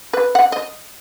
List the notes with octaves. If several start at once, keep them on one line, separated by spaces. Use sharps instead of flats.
B4
F#5
D#5